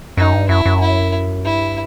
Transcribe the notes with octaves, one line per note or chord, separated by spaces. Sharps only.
F#2 D#4
G2
F#2 E4
F#2
E4
G2 E4